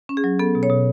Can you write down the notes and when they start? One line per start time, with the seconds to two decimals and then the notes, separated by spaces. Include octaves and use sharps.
0.09 C#4
0.17 G#4
0.24 F#3
0.39 B3 A4
0.55 B2
0.63 C#5
0.70 B2